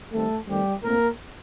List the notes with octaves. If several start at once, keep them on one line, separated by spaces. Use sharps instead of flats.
D#3 G3 A3 C4 A4
D#3 G3 A3 C4 G4
A2 A3 A#3 C4 A#4